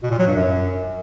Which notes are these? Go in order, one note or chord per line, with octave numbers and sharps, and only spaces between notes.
B2
A#2
F#3
G2
F#2